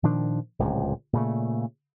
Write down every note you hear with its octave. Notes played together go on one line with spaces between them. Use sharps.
A#2 D#3 F3 D4
D1 C#2 A#2
A#2 C#3 A3